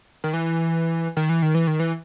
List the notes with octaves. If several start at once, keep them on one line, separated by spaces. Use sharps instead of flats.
D#3
E3
D#3
E3
D#3
E3
D#3
E3